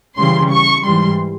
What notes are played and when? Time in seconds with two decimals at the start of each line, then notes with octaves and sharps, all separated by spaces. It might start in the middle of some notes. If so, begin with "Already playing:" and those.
0.17 C#3 E3 G3 C6
0.52 C#6
0.84 G#2 E3 G3 C6